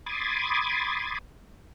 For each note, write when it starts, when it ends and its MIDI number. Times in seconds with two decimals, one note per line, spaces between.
0.06 1.18 83
0.06 1.18 84
0.06 1.18 86
0.06 1.18 87
0.06 1.18 92
0.06 1.18 93